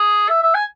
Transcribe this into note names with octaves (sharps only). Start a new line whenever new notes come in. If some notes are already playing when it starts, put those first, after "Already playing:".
Already playing: G#4
E5
E5
G#5